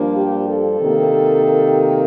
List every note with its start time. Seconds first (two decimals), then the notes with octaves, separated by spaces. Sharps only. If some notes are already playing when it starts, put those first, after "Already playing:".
Already playing: G2 F3 A#3 D4
0.16 G4
0.47 A4
0.79 C3 D#3 A#3